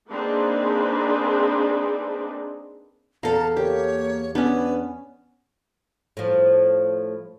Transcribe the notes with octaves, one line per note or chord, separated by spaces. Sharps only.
A#3 C4 D4 D#4 G#4 B4
E2 A4 F5 A5 A#5
A#3 G4 C#5
B3 C#4 D4 B4
A2 F3